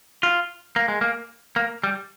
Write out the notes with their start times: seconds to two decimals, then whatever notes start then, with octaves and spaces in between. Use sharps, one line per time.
0.23 F4
0.76 A#3
0.88 G#3
1.01 A#3
1.56 A#3
1.84 G3